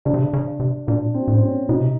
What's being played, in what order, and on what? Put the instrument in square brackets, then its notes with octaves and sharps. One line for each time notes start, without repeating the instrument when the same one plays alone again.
[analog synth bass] C#3 [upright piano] D4
[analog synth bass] C3
C#3
C#3
C3
[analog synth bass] A#2 [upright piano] D4
[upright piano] C4
[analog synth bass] A2
[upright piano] C4
C#4
[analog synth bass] B2 [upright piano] D#4
[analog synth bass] C3